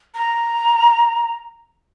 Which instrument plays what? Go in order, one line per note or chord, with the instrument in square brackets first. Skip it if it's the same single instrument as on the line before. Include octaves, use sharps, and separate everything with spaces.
[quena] A#5